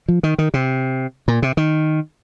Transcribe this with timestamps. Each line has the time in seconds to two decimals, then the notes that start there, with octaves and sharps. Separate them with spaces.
0.08 F3
0.23 D#3
0.38 D#3
0.54 C3
1.28 A#2
1.42 C3
1.57 D#3